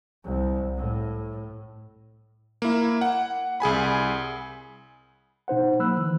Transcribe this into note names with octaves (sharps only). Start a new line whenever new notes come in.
C2
A2
A#3 E4
F#5
C2 G#4 G#5 B5
B2 D#4 C5 F#5
F#3 A#3 B5 E6 F#6
D#3 E3